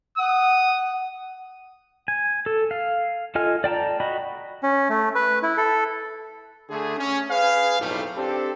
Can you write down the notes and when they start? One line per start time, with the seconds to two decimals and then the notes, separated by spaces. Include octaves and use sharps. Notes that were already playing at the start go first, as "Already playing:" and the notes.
0.18 F#5 D#6
2.08 G#5
2.46 A4
2.71 F5
3.35 F4 A4 D#5 G#5 F6
3.64 D5 G5 A5 A#5
4.00 F#4 D#5 B5
4.63 C#4
4.89 A3
5.15 B4
5.43 E4
5.57 A4
6.70 D3 A3 G#4
6.98 C#4
7.30 G#4 B4 F5
7.80 B1 F2 A2 G3 A3
8.16 C4 D4 G4 A4